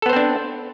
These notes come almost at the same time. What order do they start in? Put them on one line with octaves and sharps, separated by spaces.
A4 B3 C5 C4 D4